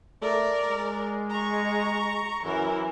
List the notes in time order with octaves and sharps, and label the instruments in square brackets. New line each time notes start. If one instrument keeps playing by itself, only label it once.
[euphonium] A3 [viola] A#4 D5
[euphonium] G#3
[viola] A#5 C#6
[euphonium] F#2 [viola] E3 A#4